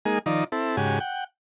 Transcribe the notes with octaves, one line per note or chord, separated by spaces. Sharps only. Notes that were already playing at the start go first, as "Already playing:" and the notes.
G#3 A#3 D#4 G#4
D#3 F3 D#4 D5
C4 E4 A4
G#2 C#3 F#4 G4 G#5
F#5 G5